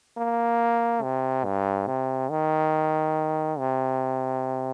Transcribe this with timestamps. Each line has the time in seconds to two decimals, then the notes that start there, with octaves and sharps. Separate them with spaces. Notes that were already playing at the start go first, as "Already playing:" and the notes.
0.17 A#3
1.02 C3
1.44 G2
1.87 C3
2.31 D#3
3.59 C3